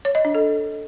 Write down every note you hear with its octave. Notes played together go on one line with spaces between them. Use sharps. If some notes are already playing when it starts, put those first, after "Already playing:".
C#5
D#5
D4
A4